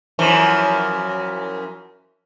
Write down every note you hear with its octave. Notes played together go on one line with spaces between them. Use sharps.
F#2 E3 F3